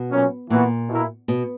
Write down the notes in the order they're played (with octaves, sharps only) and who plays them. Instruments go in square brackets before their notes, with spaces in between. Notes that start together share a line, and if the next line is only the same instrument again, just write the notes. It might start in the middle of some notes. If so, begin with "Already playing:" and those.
Already playing: [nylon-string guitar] B2
[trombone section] A#2 F#3 C#4
[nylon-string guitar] A#2 [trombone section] E3 B3 F#4
[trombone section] B2 A#3 E4 A#4
[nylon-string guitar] B2